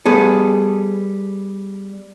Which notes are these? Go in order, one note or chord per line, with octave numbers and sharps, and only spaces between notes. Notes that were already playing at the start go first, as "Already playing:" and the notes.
G3 B3 G#4 A4